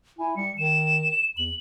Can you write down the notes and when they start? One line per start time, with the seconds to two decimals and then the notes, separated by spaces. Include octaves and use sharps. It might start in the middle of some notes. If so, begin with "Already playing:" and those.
0.19 E4 G#5
0.37 G3 C#7
0.58 D#3 E7
1.37 E2 F#7